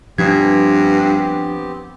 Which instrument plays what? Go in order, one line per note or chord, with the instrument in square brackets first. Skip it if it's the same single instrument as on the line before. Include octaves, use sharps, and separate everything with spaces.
[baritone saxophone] G2 [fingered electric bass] F3 [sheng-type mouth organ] B3 C4 G4 [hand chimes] D4 G#6